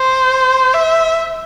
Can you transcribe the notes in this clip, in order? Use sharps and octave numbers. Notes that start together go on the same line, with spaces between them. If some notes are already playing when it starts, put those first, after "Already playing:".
Already playing: C5
E5